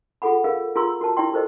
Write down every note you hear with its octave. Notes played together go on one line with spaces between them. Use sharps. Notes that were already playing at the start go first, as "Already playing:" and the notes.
F4 G#4 A4 F#5 B5
G#4 A#4 F5
F4 G#4 A#4 A#5 C6 E6
F#4 A#4 A5
E4 G4 D5 G5 C6
F#4 A4 A#4 C5 D#5